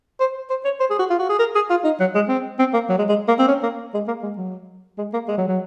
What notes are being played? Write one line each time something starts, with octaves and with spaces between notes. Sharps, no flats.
C5
C5
C#5
C5
G#4
F#4
F4
F#4
G#4
A#4
G#4
F4
D#4
F#3
G#3
C4
C4
A#3
F#3
G#3
G#3
A#3
C4
C#4
A#3
G#3
A#3
G#3
F#3
G#3
A#3
G#3
F#3
F#3